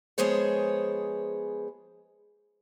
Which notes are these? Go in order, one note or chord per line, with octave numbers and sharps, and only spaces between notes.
F3 G#3 B3 G#4 C5 C#5